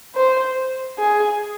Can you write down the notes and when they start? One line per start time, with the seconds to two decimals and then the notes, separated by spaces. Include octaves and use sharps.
0.15 C5
0.98 G#4